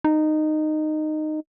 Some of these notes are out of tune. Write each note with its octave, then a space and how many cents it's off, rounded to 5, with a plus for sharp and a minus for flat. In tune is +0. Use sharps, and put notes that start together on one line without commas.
D#4 -15